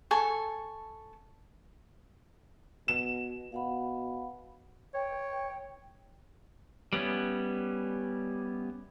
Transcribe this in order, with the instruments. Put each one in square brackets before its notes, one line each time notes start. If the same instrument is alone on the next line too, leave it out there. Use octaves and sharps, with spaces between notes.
[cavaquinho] A4 G#5 C#6
[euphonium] B2 [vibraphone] F#4 [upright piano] E7
[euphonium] B2 [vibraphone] F5 F#5 B5
[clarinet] C#5 [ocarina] G5
[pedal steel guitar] G3 B3 C#4 E4